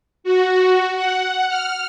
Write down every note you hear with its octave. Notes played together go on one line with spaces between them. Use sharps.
F#4
F#5
F6